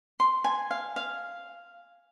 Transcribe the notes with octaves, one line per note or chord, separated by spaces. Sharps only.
C6
G#5
F5
F5